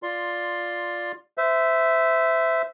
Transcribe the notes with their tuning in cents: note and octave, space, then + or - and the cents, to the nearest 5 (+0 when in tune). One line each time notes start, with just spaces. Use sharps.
F4 +0 D5 +0 C6 +10
C5 -30 E5 +0